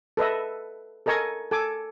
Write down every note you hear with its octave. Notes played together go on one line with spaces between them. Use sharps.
A4 B4 D#5 E5
A4 A#4 D#5 G#5 C#6
A4 G#5 D6